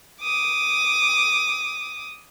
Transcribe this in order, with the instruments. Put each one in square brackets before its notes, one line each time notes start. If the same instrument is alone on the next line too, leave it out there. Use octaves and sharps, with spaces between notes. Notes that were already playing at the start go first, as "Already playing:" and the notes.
[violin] D6 D#6